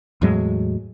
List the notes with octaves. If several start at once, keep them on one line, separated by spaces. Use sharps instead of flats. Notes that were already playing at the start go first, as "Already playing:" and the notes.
E2 A2 F#3 G#3